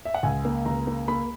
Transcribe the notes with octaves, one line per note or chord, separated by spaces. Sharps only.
E5
F#5
C#2 G#5
A#3
C#2 A#5
A#3
A#3 B5